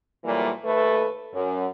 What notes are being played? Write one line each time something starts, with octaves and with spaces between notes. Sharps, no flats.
A#2 E3 F#3 G3 A3 A#3
D#2 A3 A4 B4
F#2